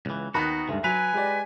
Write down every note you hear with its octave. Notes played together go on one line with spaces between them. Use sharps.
C#2 E3
D#2 D#3 B3 D#4 F#4 B5
D2 G2 G#3
F#3 B4 G#5 F7
G#3 G4 D5